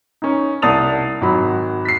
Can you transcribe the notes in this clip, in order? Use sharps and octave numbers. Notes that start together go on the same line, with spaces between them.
C#4 D#4
C2 D5 A5 D#6 A6 F7
G#1 F#3 B5
B6 C7